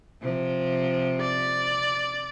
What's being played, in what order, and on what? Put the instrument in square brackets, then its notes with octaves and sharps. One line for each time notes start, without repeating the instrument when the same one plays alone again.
[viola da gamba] C3 F3
[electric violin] D5